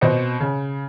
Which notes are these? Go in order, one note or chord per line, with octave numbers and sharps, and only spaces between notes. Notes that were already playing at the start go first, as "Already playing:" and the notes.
B2 C4 C5 D#5 C#7
C#3